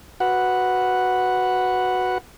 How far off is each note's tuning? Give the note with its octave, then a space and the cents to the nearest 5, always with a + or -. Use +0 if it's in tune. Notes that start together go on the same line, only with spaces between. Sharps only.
F#4 +0 B4 +0 F#5 +0